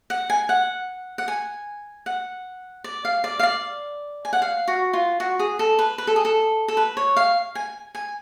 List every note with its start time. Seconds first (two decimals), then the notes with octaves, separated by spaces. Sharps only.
0.10 F#5
0.30 G#5
0.49 F#5
1.18 F#5
1.28 G#5
2.06 F#5
2.84 D5
3.05 F5
3.24 D5
3.39 F5
3.43 D5
4.25 G#5
4.33 F#5
4.42 F5
4.68 F#4
4.93 F4
5.20 F#4
5.39 G#4
5.59 A4
5.79 B4
5.98 B4
6.07 A4
6.16 G#4
6.25 A4
6.68 A4
6.77 B4
6.97 C#5
7.16 F5
7.55 G#5
7.95 G#5